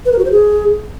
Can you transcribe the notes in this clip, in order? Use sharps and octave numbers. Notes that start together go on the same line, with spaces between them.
B4
A#4
F#4
C5
G#4